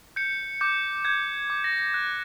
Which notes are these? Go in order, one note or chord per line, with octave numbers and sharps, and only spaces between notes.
G6 C#7
D6 G6
G6 G#6
D6
A#6
F#6